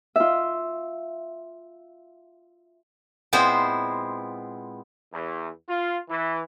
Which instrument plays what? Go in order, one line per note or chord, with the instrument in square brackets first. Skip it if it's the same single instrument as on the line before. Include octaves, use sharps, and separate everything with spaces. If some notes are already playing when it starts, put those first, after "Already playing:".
[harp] F4 E5
[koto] A#2 G#3 B3 C4 E4 C5
[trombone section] E2
F4
E3